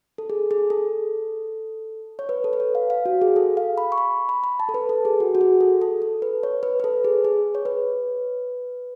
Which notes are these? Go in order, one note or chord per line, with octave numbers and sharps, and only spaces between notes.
A4
G#4
G#4
A4
C#5
B4
A4
B4
C#5
F5
F5
F#4
G#4
A4
F5
B5
C#6
B5
B5
B5
A5
A4
B4
A4
G#4
F#4
F#4
G#4
A4
A4
A4
B4
C#5
B4
B4
A4
G#4
G#4
C#5
B4